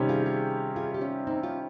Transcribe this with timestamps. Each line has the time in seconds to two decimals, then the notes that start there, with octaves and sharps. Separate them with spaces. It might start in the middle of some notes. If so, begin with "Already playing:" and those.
Already playing: C3 D#3 G3 C#4 G4
0.09 F4 G#4
0.26 F4 G#4
0.76 F4 G#4
0.94 G4
1.01 C#4 F4
1.27 C4 D#4
1.43 C#4 F4